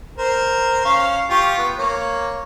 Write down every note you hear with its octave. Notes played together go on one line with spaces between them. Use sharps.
A#4 C5
C#4 F5
F4 G4 C#6
B3
A#3 C#5